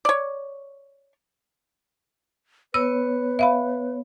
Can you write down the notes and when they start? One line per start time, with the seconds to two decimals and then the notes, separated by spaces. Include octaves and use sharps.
0.05 C#5 D5
2.74 B3 B4 C#5 E6
3.39 E5 F5 B5